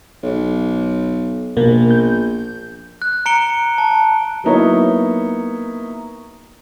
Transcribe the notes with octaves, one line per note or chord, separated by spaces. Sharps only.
B1
A#1 B2 A#3
G6
F#6
A#5 C#7 D7 G7
A5
F#3 A#3 B3 D#4 E4 C#5